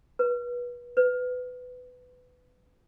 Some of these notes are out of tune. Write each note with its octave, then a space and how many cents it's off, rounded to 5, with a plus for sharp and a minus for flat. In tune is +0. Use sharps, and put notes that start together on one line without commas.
B4 -25
B4 +20